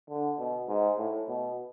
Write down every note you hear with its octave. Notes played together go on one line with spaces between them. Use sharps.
D3
B2
G#2
A2
B2